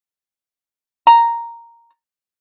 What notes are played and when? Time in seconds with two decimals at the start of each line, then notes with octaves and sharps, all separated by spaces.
1.07 A#5